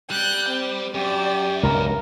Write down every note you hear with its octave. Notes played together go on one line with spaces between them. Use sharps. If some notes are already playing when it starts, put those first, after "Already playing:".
G3 F#6 G6
C4
F#2 G4 D5
C#2 G2 B2 A#4